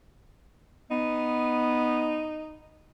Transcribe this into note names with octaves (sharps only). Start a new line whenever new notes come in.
B3 D#4